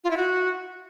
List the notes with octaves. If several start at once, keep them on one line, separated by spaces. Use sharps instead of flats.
F4
E4
F#4